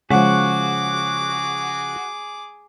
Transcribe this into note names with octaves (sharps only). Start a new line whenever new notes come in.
C#3 F3 G#3 F#4 G#4 F#5 D6